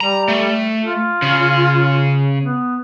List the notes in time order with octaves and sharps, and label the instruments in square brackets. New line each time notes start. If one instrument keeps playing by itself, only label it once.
[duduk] G3 [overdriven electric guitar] A#5
[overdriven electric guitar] A3
[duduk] F4
[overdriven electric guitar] C#3
[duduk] B3